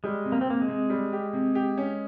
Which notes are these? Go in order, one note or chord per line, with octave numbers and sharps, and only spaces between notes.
G3 G#3
C3
A#3
C4
C3 A#3
G#3
C3
G3
G4
C3
G4
C#4